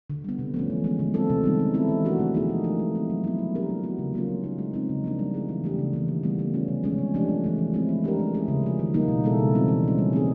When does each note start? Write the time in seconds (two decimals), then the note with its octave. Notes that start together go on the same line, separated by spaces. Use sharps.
0.10 D3
0.24 G3 B3
0.39 C3
0.54 F3 A3 C#4
0.70 E3
0.84 G#3 B3
0.99 D3
1.14 G3 C4 F4 A4
1.30 C3
1.44 D#3 G3 B3 D#4
1.59 G#3
1.74 C4 E4 A4
1.89 E3
2.05 A3 D4 F#4 A#4
2.19 C3
2.34 F3 A#3 D#4 G#4
2.49 F3
2.64 A3 D4
2.79 G#3
2.95 C4 E4
3.10 F#3
3.24 B3 E4
3.39 A3
3.55 D4 G4 A#4
3.70 G3
3.83 B3 D4 F#4
3.99 C#3
4.14 F#3 A#3 C#4 F4
4.29 F#3
4.44 A#3 D#4
4.58 G#3
4.74 C4 D#4
4.89 C#3
5.04 F3 A#3 D4
5.19 G3
5.34 B3 E4 G#4
5.49 E3
5.64 A3 D4 G4
5.79 C#3
5.93 E3 G3 A#3
6.08 D#3
6.23 G3 B3
6.39 A3
6.54 C#4 F4
6.68 C3
6.84 F3 G#3 C#4
6.98 C3
7.14 F3 A3 D4 G4
7.29 C3
7.44 E3 A3
7.58 F3
7.73 G#3 C4 E4
7.89 A3
8.04 D4 G4 A#4
8.19 G#3
8.34 C#4 E4 G#4
8.48 C#3
8.63 F3 G#3
8.79 D#3
8.94 G3 A#3 D#4
9.08 B2
9.24 G#3 B3 E4 A4
9.39 C#3
9.53 E3 G3 C4 F4
9.68 E3
9.84 A3 C#4
9.98 G3
10.13 C4 D#4 G#4